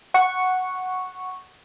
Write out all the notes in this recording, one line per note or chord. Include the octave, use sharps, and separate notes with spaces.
F#5 C#6